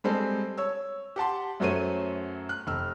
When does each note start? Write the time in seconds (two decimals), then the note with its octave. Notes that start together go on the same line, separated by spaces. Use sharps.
0.04 G3 G#3 C4 A4
0.57 C#5 E6
1.16 G4 F#5 A5 C6
1.60 F#2 F#3 A3 C5 C#5 D#7
2.49 F#6
2.67 F1 E6 F6